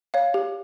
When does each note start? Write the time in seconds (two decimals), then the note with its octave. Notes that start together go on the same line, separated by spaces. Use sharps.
0.14 C#5 F5
0.34 G4